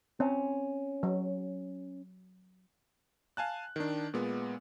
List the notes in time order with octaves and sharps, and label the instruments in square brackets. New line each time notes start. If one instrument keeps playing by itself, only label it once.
[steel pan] C4 [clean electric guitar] C#4
[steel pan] F#3
[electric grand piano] F5 G#5 A5 F#6
D#3 D4
A#2 G#3 B3